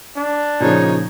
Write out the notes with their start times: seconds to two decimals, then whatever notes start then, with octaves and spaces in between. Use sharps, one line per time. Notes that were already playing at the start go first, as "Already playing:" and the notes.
0.17 D4
0.60 A#2 C#3 F3 D#4 C#5